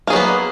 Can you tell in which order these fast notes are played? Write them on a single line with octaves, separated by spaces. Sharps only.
A#3 G#4 F#3 B3